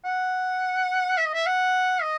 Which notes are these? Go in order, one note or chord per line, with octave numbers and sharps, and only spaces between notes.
F#5
E5
D#5
E5
F#5
D#5